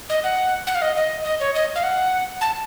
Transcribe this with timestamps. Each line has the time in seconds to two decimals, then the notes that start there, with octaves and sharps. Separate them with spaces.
0.10 D#5
0.24 F#5
0.67 F#5
0.75 F5
0.82 D#5
0.96 D#5
1.25 D#5
1.40 C#5
1.55 D#5
1.76 F5
1.83 F#5
2.41 A5